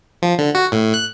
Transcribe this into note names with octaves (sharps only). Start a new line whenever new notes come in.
F3
D3
F#4
A2
F#6